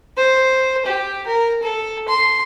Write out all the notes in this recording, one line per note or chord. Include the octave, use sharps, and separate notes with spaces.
C5
G4
A#4
A4
C6